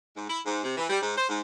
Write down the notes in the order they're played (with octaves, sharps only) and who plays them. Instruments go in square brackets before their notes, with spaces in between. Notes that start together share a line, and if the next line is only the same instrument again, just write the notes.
[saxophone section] G#2
E4
G#2
C3
E3
G3
G#2
C5
G#2